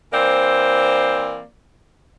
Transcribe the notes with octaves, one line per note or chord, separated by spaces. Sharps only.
E3 A#3 C4 C5 D5